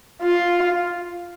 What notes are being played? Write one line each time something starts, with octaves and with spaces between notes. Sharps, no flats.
F4